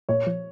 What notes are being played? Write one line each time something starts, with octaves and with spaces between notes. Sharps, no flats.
A#2 C#5
F3